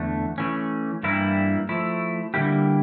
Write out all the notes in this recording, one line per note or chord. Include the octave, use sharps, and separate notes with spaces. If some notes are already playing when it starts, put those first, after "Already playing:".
Already playing: E2 D3 A3
E3 A3 C#4
G2 E3 G3 A#3 E4
F3 A3 E4
D3 G3 A#3 E4 G4